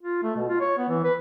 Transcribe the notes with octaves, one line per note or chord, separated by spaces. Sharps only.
F4
A3
B2
F4
C#5
B3
E3
B4